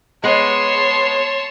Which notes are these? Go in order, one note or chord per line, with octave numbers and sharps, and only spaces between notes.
G#3 B3 C#5 A5 C6